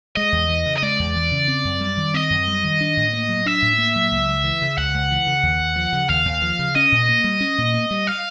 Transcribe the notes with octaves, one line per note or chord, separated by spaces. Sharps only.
G#3 D#5
E2
E3
C#3
D#5
G#3 D5
E2
E3
C#3
C4
F#2
G3
D#3
C4 D#5
F#2
G3
D#3
D4
A2
A#3
F#3
D4 E5
A2
A#3
F#3
C#2
C#2
E3
C#3
C#2 F#5
C#2
E3
C#3
D#2
D#2
F3
C#3
D#2 F5
D#2
F3
C#3
C#4 D#5
A#2
A#3
G3
C#4
A#2
A#3
G3
F5